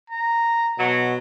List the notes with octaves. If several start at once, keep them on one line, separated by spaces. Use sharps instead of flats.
A#5
B2 F#3